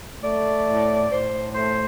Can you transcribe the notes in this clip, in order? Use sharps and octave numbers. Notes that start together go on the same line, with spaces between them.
A3 D5
A2
A2 C5
A3 C5